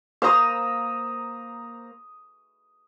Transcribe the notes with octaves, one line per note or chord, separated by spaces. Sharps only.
A#3 C5 A#5 D#6 E6